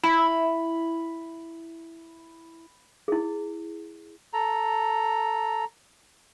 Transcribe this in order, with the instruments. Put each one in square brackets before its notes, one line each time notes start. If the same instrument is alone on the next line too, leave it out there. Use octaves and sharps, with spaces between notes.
[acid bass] E4 [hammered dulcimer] B5
[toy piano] E4 G#4
[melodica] A4 A#5